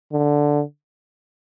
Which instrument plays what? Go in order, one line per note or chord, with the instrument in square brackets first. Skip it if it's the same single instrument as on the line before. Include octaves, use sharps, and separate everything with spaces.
[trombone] D3